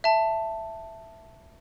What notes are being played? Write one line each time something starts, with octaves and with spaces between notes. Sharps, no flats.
E5 A5